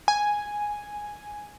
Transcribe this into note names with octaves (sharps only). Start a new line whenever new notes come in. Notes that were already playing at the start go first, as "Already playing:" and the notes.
G#5